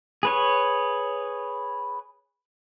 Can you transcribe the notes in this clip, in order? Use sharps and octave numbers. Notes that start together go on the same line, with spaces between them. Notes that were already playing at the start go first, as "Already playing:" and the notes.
G#4 B4 C#5